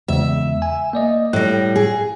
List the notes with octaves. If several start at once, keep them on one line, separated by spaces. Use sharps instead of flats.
E2 C#3 G#3 E5
G#5
A#3 D5 D#5
A2 G3 F#6 A#6
G#4